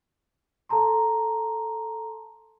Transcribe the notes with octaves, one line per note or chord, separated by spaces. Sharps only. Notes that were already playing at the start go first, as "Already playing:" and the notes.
A4 A5 A#5 C6